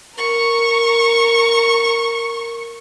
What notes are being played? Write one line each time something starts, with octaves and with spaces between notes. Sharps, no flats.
A#4 C#6